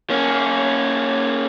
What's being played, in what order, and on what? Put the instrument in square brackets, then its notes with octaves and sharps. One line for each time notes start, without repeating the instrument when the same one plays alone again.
[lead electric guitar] A#3 C#4